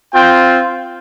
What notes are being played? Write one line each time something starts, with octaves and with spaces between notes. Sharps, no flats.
C4 F4 G5